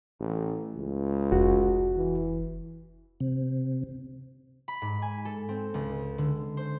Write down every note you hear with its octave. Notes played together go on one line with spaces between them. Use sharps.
A1
C#2
F1 F#4
E3
C3
B5
G#2
G#5
A4
C4
C#2
D3
C5